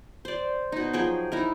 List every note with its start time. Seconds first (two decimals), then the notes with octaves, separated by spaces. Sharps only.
0.25 C5 D5
0.72 B2 D#4
0.93 F3 F#3 G#4 G5
1.32 D#4 E4 A#4